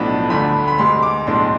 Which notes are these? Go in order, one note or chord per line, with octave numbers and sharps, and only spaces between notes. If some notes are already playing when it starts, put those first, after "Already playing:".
Already playing: B1 A2 F3 B3 D4 B5
D2 D3 A3 D4 B5
B5
D2 C3 G#3 C6
D6
B1 A2 G#3 D4 C6